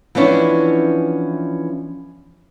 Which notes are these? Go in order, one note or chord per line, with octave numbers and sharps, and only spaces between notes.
E3 F3 B3 C#4 D4 E4